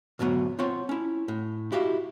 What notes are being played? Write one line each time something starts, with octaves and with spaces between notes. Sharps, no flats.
D2 G#2 B2 F#3 B3
C4 F4 C#5 F#5
C#4 E4
A2
E4 F#4 G4 D#5 F5